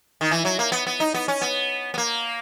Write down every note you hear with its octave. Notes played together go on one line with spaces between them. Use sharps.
D#3
E3
F#3
A#3
B3
B3
D#4
B3
C#4
B3
B3
A#3